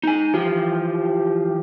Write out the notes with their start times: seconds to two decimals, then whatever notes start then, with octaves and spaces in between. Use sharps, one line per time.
0.03 D#4 G#5
0.33 E3 F3 F4 G4